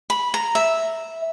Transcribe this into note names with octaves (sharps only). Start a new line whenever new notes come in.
B5
A#5
E5